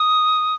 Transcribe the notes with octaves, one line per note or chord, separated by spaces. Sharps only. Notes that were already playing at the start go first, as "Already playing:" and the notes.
Already playing: D#6